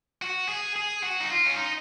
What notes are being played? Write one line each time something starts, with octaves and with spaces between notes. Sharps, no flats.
F#4
G#4
G#4
F#4
D#4
F4
C#4
D#4